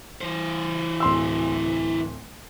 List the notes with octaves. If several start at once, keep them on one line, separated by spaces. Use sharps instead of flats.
E3 C5
D1 C6 E6